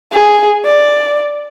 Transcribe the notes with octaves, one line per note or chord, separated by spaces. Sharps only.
G#4
D5